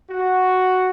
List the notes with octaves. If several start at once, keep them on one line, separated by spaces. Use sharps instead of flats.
F#4